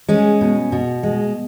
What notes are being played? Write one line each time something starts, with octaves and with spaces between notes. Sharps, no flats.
G#3 C#4
B2
B2
G#3